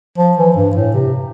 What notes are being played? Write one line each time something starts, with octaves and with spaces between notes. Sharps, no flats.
F3
E3
G2
A2
C3